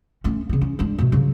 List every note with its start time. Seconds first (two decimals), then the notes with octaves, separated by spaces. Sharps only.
0.24 A3 C#4
0.49 C#3 B3
0.61 C#4
0.79 G#3 D4
0.98 B2 A3
1.12 C#3 F#3